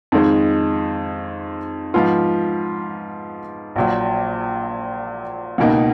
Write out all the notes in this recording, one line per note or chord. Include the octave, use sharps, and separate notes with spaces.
F2 D#3 G#3
G#2 F3 B3 F4
A#1 A#2 F#3
C#2 B2 A#3 D#4